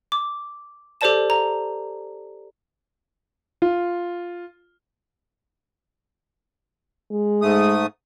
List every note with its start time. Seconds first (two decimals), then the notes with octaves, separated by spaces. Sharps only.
0.12 D6
1.01 G4 A4 C5 D5 A5 E7
1.30 A#5
3.62 F4
7.11 G#3
7.42 G#2 A3 D#6